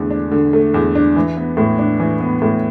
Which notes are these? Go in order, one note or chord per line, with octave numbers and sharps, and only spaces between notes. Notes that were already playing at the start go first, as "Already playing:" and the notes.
Already playing: E2 D3 A3
D4
D3
A3
E2
D4
E3
B3
A2
D4
E3
B3
A2